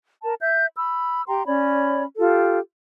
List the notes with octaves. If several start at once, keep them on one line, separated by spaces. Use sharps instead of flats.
A#4 A5
E5 G6
B5 E6
G4 G5 A#5 C6
C#4 C#5 D5 B5
F4 G4 A4